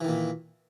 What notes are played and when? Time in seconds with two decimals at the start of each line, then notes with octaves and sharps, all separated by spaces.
0.01 E3
0.04 D#3
0.08 A#2